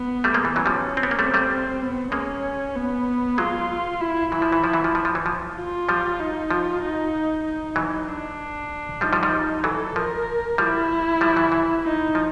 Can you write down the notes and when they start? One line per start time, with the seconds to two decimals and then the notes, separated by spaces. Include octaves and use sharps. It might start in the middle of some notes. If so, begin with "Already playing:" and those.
Already playing: B3
0.24 G3 A3
0.34 G#3 A#3
0.45 E3
0.56 E3 F#3 C#4
0.66 F3 G3
0.97 C4
1.03 B3
1.11 A#3
1.19 G3 A3 C4
1.34 G3 A3
1.82 B3
2.12 G#3 A#3 C#4
2.76 B3
3.38 F#3 G#3 F4
4.01 E4
4.32 E3 F#3 E4
4.42 F3
4.52 E3
4.64 F3
4.73 E3 F#3
4.84 F3
4.95 F3
5.05 F3
5.15 E3
5.26 F3
5.57 F4
5.89 F3 G3
6.19 D#4
6.51 F3 F4
6.82 D#4
7.45 D#4
7.76 E3 F#3
8.08 D4
9.01 F3 G3 D#4
9.13 F3 G3
9.23 F3 G3
9.64 E3 F#3 A4
9.96 F3 A#4
10.58 F3 G3 E4
11.21 F3 G3
11.36 E3 F#3
11.52 E3
11.84 D#4
12.15 F3